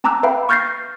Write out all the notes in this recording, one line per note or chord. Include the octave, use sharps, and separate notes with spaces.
C4 A5 A#5 D6 E6 F#6
B4 E5 F5 G5 B5
C#6 F6 G6 A6 A#6 C7